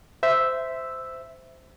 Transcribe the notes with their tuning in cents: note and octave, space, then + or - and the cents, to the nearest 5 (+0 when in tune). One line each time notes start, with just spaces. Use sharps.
C5 -15 E5 +0